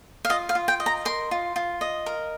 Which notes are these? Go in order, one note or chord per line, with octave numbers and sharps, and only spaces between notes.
F5
F4 D#5
F5
F4
G5
D#5
A#5
A#4 C6
F4
F4
D#5
A#4